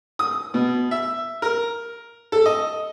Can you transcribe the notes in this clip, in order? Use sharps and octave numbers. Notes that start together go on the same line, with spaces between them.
D#6
B2
E5
A#4
A4
D#5